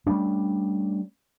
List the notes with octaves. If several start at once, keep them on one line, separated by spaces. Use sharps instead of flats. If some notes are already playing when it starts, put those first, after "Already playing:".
G3 A3 C#4 D4